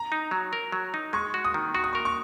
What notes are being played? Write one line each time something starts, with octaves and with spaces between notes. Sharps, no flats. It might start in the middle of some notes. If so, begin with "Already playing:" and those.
Already playing: A#5
D#4
F#3
A#4
F#3
D#4
G#3 C#6
F#4
D#6
D#3
F#4 C#6
D#6
A#4 C#6
C#6